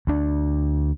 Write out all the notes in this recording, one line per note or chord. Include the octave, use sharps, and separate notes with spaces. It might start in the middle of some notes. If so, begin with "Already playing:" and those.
D2 D4